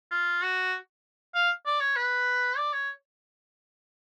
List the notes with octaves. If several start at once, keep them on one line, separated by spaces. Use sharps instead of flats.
F4
F#4
F5
D5
C#5
B4
D5
C#5